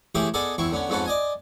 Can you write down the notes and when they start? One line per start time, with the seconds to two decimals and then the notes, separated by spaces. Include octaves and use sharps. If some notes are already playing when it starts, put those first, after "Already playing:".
0.15 A2 E3 G4 G#4 G5 B5
0.34 B3 G#4 A4 D5 D#5
0.58 E2 C4 E4 C#6
0.72 D3 B3 C#4
0.89 F2 G#2 B3 C#4 A4 B4
1.06 D5 D#5 G#5